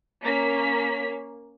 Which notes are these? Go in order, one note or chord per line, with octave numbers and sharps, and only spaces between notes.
A#3 C#4 B6